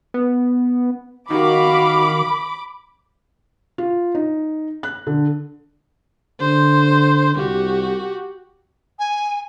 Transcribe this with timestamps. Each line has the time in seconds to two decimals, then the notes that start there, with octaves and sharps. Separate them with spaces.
0.14 B3
1.30 D#3 F#4 F5 B5 D6
3.78 F4
4.15 D#4
4.83 F#6
5.07 D3
6.40 D3 C5
7.35 C2 F#4 G4
8.99 G#5